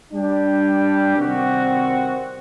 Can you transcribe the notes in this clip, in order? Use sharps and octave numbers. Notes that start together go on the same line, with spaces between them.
G3 D4 G4
C3 D#3 G3 C4 F#4